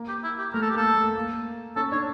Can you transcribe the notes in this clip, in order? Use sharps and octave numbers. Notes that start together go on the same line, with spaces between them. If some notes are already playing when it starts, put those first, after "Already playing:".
Already playing: A#3
G4
E4
G4
A3 A#4
A4
G4
A#3 A4
A3
A#3
C#4 A4
D4 C#5